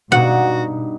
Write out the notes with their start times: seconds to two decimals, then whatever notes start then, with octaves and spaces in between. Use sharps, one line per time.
0.12 G2 B2 D#4 F#4 F#5